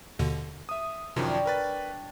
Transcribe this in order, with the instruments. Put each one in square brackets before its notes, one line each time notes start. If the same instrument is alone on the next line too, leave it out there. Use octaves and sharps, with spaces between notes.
[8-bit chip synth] D#2 B2 D3
[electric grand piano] E5 D#6
[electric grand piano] F#2 D#3 F3 [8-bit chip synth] C3 [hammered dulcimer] G3 D4 C#5
[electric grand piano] A#4 B4 A6